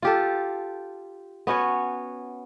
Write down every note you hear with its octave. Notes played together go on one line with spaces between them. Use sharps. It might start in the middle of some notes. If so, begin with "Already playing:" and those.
F4 G4 A4
B3 C#4 F#4 C#5